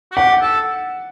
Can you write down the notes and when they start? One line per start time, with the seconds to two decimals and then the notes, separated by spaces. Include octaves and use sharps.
0.12 F#4
0.16 G4 F#5
0.42 A4